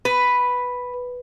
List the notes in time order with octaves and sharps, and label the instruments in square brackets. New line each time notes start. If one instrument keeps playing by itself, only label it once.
[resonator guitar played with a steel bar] B4